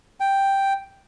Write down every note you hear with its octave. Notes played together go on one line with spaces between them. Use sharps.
G5